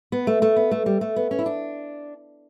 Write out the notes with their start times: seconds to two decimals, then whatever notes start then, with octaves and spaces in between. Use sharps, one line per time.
0.12 B3
0.27 A3
0.42 A3
0.56 B3
0.71 A3
0.86 G3
1.01 A3
1.16 B3
1.31 C#4
1.39 E4
1.46 D4